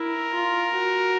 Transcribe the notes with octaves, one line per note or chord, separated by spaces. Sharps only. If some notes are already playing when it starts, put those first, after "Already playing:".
Already playing: E4 A#4
F4
F#4